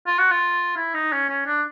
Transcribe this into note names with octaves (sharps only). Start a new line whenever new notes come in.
F4
F#4
F4
E4
D#4
C#4
C#4
D4